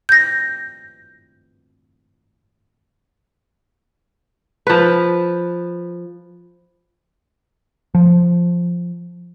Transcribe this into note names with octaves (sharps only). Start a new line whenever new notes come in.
G6 A#6
F3 B4
F3